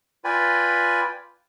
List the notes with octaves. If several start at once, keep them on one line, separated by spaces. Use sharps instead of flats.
F4 B4 D5 G5 G#5 B5